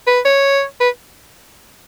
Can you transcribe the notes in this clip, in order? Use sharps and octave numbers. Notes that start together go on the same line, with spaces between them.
B4
C#5
B4